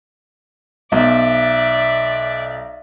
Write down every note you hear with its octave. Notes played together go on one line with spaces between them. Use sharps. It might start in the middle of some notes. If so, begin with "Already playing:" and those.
B1 D5 E5